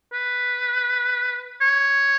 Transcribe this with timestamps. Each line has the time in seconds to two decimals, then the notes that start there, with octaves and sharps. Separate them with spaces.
0.13 B4
1.61 C#5